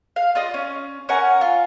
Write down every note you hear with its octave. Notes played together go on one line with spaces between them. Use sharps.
F5
F4 D5 D#5
C#4
C#4 A#4 F#5 G#5
F4